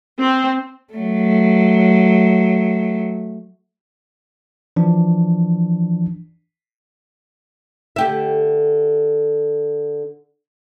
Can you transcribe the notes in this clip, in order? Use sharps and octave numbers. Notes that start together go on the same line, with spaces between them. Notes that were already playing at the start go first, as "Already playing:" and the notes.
C4
F#3 A3
E3 F3 D4
D3 G4 E5